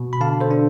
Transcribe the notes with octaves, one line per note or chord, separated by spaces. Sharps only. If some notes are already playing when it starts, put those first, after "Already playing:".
Already playing: B2
B5
D3 F5 A5
A4 C5
D4